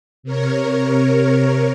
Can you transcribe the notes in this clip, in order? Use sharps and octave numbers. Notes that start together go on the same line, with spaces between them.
C3 A#4 C#5